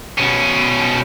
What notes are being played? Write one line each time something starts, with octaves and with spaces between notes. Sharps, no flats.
B2 C#4